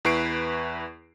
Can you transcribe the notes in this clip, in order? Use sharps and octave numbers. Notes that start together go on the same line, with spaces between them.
E2 E4 B4 C#6 C7 D7